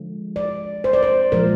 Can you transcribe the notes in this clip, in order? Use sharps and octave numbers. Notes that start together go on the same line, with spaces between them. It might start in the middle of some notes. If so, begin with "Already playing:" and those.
Already playing: D3 F3 G#3
D5
C5
D5
C5
A#2 F3 G#3 A#4